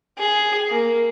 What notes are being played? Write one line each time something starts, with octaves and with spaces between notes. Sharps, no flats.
G#4
A#3